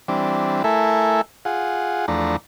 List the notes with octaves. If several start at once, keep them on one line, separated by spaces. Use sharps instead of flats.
E3 G3 C4 D4
A3 E4 A4 A#4 E5 G#5
F4 G#4 F#5
E2 F3 A3 D4 A#5